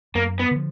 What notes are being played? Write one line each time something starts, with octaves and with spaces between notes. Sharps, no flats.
F#2 A#3
B3
D3 F3